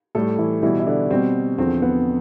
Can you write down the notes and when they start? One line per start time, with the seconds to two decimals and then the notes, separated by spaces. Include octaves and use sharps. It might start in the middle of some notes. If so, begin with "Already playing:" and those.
0.15 A2 G3 A3 A4
0.39 E3 E4
0.62 B2 E3 G3 E4
0.80 E4
0.87 D3 D4
1.10 B2 G3 C4
1.58 E2 D3 F3 C4
1.82 B3